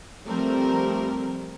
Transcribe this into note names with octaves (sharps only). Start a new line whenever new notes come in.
F3 G3 A3 C4 A#4